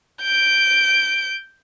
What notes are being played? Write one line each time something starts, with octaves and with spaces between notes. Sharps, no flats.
G6 D7